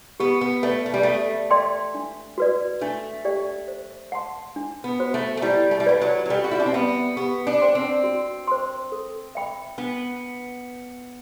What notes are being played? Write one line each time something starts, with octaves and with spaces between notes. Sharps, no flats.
B3 G4
B3
A3 B4 D5
A3
G3
A3 A4
D5 G5 C6
D4
F#4 B4 D5
A3 D4
G4 D5 G5
C5
F#5 A5 C6
D4
B3
F#4 C5
A3
A3
G3 E4
A3
G3
A3 B4 D5 F#5 B5
F#3
F#3
G3 A4
F#4
E4
D4
C4
B3 E5 B5
B3 G4
D4
C5 G5 C6
C4
F#4
C5 G5 C6
A4
E5 G5 B5
B3 D4